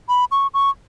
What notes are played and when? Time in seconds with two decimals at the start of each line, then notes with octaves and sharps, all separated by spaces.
0.09 B5
0.31 C#6
0.54 C#6